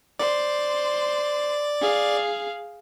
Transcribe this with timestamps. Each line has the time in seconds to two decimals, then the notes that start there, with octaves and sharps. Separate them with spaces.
0.19 C5 D5
1.81 G#4 F5